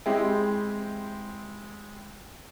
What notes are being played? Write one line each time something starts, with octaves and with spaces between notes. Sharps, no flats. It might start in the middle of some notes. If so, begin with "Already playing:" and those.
G#3 C4 E4 G4